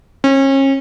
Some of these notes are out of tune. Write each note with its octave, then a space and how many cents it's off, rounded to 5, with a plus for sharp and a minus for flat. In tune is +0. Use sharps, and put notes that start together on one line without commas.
C#4 -35